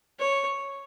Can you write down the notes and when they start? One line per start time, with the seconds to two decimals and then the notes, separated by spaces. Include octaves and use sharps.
0.19 C#5